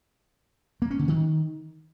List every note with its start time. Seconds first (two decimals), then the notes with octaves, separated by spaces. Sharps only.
0.82 A#3
0.91 C#4
0.99 D3
1.08 D#3